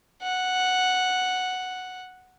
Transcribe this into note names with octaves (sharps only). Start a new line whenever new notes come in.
F#5